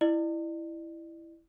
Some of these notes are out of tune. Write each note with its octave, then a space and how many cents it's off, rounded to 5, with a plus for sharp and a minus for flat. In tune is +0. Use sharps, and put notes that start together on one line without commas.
E4 +0 D5 +40